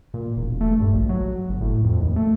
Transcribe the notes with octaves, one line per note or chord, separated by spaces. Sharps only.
A#2
E1
A3
G2
A#1
F#3
G1
A2
F2
D#2
A3